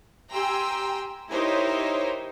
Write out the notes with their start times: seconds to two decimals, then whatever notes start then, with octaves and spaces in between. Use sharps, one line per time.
0.32 G4 G5 G#5 A#5 C6 E6
1.31 D#4 E4 G4 A#4 C5 C#5